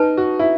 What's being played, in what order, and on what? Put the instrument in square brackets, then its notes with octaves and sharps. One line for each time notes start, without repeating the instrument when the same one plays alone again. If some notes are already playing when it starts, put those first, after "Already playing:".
Already playing: [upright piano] D#4 [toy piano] B4 A5
[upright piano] F#4
E4